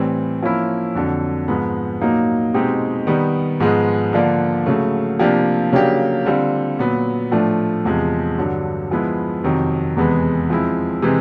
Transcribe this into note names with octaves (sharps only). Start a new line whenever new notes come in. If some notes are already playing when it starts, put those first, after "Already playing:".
Already playing: A2 E3 G3 C4
F3 A#3 C#4 E4
F2 D3 F#3
G#2 F3 G#3 B3
A#2 F#3 A#3 D#4
B2 G#3 C4 D#4 G4
D#3 G3 B3
G#2 F3 G#3 B3
D3 F3 A#3 D4
C#3 F#3 A3
C3 F3 A#3 D4 G4
C#3 F#3 A#3 D4 G4
D3 G3 C4 F4
A#2 F#3 B3
A2 F3 A3 D4
E2 C3 F3 G#3
G2 D3 F#3
F3 G#3 B3 E4
F2 C3 D#3 F#3
E2 C3 E3 G#3 B3
F3 G#3 C4 E4
C3 E3 G#3 C4